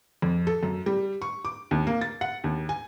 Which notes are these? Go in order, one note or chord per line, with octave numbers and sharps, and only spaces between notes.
F2
A4
F#2
G3
C#6
D6
D#2
A#3
A6
F#5
D#2
G#5